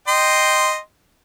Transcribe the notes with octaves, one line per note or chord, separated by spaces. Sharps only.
D#5 G5 C6